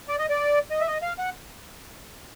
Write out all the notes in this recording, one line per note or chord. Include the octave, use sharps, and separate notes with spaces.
D5
D#5
D5
D#5
E5
D#5
F5
F#5